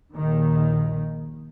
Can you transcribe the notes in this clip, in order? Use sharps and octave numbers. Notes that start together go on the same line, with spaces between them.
A#1 D#2 D#3